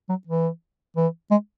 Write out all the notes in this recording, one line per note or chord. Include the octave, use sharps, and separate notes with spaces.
F#3
E3
E3
G#3